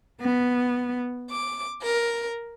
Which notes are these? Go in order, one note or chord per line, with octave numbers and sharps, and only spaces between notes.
B3
D6
A#4